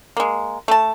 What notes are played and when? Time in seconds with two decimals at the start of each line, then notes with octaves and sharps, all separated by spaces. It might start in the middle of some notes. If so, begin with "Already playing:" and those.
0.17 G#3 A#3
0.68 A3 A5